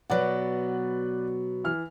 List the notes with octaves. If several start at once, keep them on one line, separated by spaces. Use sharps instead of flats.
B2 F#3 B3 B4 D5 F#5
E3 F6